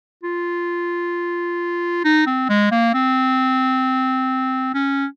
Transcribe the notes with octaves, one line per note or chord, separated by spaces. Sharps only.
F4
D#4
C4
G#3
A#3
C4
C#4